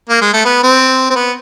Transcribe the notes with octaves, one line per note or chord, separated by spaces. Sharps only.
A#3
G#3
A3
B3
C4
C4
B3